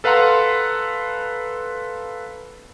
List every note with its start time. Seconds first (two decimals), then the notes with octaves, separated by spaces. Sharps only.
0.04 A4 B4 F5 F#5 A#5 C6